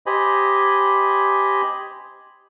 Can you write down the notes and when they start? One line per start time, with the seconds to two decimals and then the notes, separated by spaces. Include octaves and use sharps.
0.06 G4 C5 D#5 G#5 B5